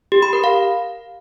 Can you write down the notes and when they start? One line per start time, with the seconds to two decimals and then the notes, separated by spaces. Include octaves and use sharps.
0.12 G4
0.22 B5
0.33 A#4
0.44 F5